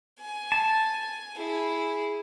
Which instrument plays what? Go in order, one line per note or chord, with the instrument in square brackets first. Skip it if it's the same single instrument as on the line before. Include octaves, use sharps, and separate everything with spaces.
[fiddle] G#5
[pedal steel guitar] A5
[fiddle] E4 G#4